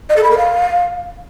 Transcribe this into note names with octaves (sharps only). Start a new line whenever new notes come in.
D#5
A4
B5
A#4
F5